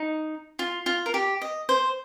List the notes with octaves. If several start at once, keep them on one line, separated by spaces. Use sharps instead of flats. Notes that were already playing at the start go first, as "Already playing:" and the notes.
Already playing: D#4
F4
F4
A#4
G4
D#5
C5